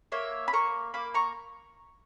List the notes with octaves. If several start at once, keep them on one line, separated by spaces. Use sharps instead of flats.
A#3 C#5 E5
B5
A#3 A#5 C#6
A#3 B5 D6
A#5 C#6